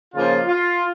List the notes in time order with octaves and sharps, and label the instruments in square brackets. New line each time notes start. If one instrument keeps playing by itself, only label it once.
[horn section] C#3 F3 A#3 D#4 F4
F4